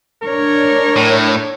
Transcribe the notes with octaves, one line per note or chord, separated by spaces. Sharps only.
D4 A#4 C#5
A2